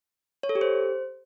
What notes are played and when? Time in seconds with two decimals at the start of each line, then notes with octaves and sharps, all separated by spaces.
0.43 C#5
0.49 A4
0.55 G4
0.61 C5